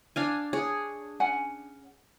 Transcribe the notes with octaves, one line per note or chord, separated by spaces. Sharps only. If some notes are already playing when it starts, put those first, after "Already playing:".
D4 F5 G#5
G#4 C#5
C#4 F#5 G#5